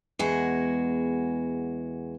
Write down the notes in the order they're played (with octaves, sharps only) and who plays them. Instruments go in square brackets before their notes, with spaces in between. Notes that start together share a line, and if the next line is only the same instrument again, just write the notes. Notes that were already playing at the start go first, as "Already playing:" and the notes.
[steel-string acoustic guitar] E2 G#3 F#4